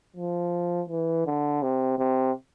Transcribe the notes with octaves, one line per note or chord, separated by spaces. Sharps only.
F3
E3
D3
C3
C3